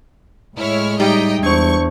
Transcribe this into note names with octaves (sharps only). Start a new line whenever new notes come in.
A2 G#3 E4 C#5 F6
G3 D#4 G4 D#5 E5 G5 A#5
E2 D4 C5 C#6